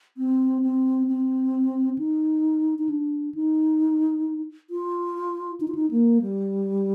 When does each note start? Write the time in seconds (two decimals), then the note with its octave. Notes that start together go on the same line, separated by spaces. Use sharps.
0.17 C4
0.63 C4
1.08 C4
1.98 D#4
2.79 D#4
2.89 D4
3.34 D#4
4.70 F4
5.61 D#4
5.68 F4
5.75 D#4
5.91 A#3
6.22 G3